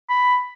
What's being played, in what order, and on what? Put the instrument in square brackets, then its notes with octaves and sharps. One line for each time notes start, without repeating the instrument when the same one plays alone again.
[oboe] B5